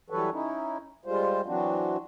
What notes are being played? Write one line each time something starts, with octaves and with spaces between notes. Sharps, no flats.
E3 F#3 G3 A4 B4 C#5
C#4 D#4 E4
G3 G#3 F4 C5
E3 F#3 C4 D4 F#4